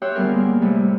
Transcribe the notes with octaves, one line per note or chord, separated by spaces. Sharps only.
G4 C#5 E5 G5 C6 F#6
D2 G3 B3 G#4 A#4 F6
A#3
A2 C3 G3